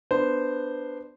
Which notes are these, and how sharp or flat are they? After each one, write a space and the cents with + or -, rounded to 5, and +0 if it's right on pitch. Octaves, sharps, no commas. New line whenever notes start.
B3 +0 D4 +10 C5 -10